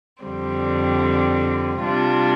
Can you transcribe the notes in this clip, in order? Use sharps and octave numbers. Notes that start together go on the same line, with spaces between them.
F2 D3 G3 C4
C3 G3 D4 F4